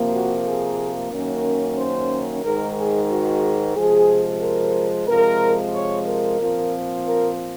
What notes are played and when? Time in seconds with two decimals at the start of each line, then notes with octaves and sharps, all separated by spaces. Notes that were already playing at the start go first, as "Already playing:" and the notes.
Already playing: C3 F3 A#3
0.12 F#4
0.44 G#4
1.10 F#2 D#3 A#3 C#4 A#4
1.77 C5
2.43 G#2 D#3 G#3 A#4
2.76 G#4
3.09 F#4
3.74 C3 F3 G#3 G#4
4.41 A#4
5.07 C3 F3 G#3 A#4
5.73 C#5
6.06 A#4
6.39 A#2 F3 C4
7.05 A#4